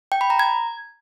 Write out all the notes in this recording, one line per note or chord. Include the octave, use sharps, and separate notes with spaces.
G5
B5
A#5
G#6